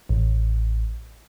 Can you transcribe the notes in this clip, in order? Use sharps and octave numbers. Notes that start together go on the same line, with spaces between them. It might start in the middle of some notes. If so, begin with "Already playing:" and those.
A1